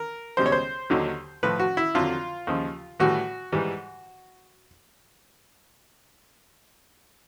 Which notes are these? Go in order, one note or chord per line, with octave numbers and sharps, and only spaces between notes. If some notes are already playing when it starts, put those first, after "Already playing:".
Already playing: A#4
C#2 B2 G3 C5
C#5
C5
D#2 D3 F#3
A2 F3 B4
F#4
E4
F2 D3 F#3 F4
D#2 C#3 F3
A2 E3 G3 F#4
G#2 E3 G3